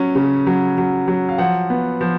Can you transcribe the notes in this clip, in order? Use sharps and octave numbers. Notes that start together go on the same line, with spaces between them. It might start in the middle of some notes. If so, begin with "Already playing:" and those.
Already playing: F#3 C#4
C#3
F#3
F#3
F#3
F5
F3 F#5
B3
F3